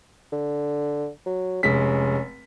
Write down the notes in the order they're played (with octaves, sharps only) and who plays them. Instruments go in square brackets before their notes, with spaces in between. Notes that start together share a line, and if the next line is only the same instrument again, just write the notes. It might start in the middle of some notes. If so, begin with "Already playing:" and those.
[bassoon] D3
F#3
[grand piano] F1 G#3 B6 [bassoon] C#4